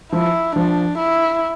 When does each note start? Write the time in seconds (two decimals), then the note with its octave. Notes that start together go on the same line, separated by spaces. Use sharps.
0.12 F3 E4
0.56 F3 D4
0.98 E4